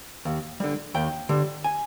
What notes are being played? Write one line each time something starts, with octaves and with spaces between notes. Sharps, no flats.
D#2
D3 G3
D#2 G5
D3 G3
G#5